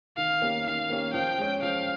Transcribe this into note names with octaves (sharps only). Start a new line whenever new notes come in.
D#3 F5
A#3 C#4 G4
D#3 F5
A#3 C#4 G4
F3 G5
G#3 C#4
F3 F5